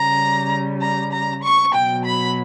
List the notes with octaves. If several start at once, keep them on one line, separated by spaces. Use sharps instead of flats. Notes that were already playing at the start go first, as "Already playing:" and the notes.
Already playing: C#3 G3 A#5
A#5
A#5
C#6
B2 F#3 G5
B5